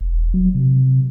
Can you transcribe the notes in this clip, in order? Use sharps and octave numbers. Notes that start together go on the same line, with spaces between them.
E1
F#3
C3